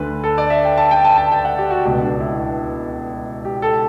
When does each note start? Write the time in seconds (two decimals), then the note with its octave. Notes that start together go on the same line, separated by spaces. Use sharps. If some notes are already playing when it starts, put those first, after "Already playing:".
Already playing: D2 D3 B4
0.24 A4
0.38 D5
0.50 E5
0.64 G5
0.77 A5
0.91 G5
1.04 A5
1.17 A5
1.31 G5
1.45 F#5
1.58 G4
1.70 F#4
1.85 C#2 B2
2.02 D4
2.20 E4
3.45 G4
3.62 A4